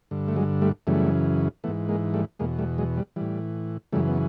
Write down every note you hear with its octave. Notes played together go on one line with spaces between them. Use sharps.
G2 D3
A3
F#3 G#3
G3 A3
F#2 C#3 E3 G3 A3
G#2 E3 A3 B3
G#3 A#3
G3 A3
E2 B2 G#3 A#3
G3 A3
F#3 G#3
G3
A2 E3 G3
F#2 C#3 E3 G3 A3
B3